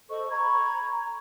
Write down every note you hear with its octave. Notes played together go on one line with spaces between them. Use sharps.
A4 C5 D#5 C#6
A#5 B5 C#6 G#6